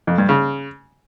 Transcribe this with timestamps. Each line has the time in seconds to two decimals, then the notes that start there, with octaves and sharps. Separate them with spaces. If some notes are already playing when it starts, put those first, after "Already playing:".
0.07 F2
0.18 G2
0.29 C#3